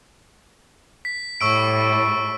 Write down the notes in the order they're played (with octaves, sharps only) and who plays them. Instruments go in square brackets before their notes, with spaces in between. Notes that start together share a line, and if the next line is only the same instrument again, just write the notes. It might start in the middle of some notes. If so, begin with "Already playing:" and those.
[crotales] B6
[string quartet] A2 G3 [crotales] C#6 E6 D7